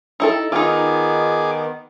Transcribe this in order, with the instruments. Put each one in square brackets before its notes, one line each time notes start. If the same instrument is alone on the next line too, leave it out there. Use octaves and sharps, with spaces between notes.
[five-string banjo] D#4 E4 A4
[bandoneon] D#3 B3 [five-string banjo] D#4 F4 [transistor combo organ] G#4 D6